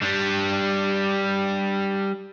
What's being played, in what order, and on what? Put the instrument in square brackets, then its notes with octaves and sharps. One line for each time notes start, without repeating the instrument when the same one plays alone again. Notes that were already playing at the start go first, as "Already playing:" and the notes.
[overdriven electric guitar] G3 D4